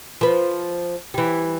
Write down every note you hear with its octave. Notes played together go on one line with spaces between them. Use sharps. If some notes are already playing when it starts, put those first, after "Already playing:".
F3 B4
E3 G3